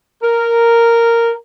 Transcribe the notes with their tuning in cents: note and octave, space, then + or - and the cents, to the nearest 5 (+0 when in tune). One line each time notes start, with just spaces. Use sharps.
A#4 -5